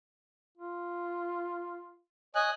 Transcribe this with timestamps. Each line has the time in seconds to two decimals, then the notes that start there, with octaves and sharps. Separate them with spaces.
0.58 F4
2.35 C#5 D#5 G#5 F#6